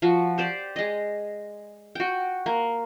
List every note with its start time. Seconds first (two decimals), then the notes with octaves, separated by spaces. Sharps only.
0.02 F3 F#4
0.38 G4 C5 D5
0.76 G#3 D#5
1.95 F#4 G5
2.46 A#3